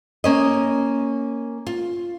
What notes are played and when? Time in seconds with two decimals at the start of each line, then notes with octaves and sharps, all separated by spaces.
0.24 A#3 C#4 D#5
1.67 F4